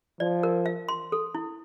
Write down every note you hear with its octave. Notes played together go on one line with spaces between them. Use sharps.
F3 D5
A#4
F5
C6
A4
E4